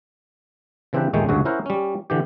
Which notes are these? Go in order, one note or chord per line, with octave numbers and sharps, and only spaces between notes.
C#3 E3 C4 D4 G4 B4
A#1 D#2 D#3 G#3 A3 G5
D2 G2 C#3 G#3 F#4
C#4 E4 A#4 C5 F#5
G3 C#4
D3 E3 G4